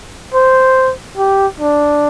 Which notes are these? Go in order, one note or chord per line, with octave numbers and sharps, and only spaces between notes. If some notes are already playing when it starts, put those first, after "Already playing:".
C5
G4
D4